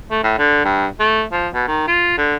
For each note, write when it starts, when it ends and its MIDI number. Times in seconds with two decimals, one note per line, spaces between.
0.11 0.23 57
0.24 0.35 45
0.38 0.65 50
0.65 0.86 43
1.00 1.24 57
1.32 1.48 53
1.54 1.65 47
1.67 1.87 51
1.88 2.16 65
2.18 2.36 50